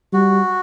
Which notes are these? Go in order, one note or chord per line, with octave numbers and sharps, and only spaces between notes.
G3 F#4